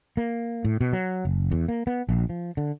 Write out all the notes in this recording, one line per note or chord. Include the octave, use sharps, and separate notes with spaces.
A#3
A2
B2
F#3
F#1
E2
A#3
B3
A#1
F3
D3